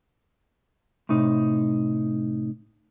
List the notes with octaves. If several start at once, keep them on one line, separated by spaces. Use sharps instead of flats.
A2 C3 D#4